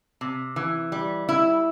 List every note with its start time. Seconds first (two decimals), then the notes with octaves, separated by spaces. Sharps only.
0.21 C3
0.56 E3
0.92 G3
1.29 E4